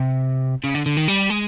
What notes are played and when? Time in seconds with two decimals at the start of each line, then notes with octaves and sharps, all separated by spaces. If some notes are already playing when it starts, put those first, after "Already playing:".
Already playing: C3
0.64 C#3
0.75 D3
0.86 D3
0.97 D#3
1.08 G3
1.30 G#3